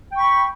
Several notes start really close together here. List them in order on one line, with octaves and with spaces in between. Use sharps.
G5 C#6 B5